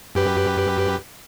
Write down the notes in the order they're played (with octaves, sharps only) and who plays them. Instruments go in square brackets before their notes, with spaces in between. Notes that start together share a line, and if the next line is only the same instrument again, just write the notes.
[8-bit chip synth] F#2 G4 B4